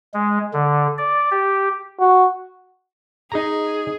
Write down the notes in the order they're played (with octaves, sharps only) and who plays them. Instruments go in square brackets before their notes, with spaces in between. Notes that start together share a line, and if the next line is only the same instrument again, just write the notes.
[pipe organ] G#3
D3
D5
G4
[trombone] F#4
[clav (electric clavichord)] D#4 A#5 [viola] G#4